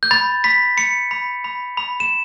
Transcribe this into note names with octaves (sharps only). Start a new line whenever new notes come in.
G6
B5 A6
B5 B6
B5 C#7
B5
B5
B5
E7